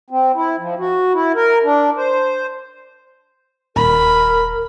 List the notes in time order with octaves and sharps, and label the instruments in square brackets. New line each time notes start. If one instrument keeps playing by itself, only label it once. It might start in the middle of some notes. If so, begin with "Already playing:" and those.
[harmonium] C4
E4
F3
F#4
E4
A#4
D4
C5
[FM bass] D#1 [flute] A#4 [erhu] B5